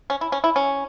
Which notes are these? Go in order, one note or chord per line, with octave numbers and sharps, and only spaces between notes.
C#4
E4
C#4
E4
C#4